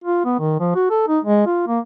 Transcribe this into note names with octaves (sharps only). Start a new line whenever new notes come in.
F4
B3
D#3
F3
F#4
A4
D#4
G#3
F4
A#3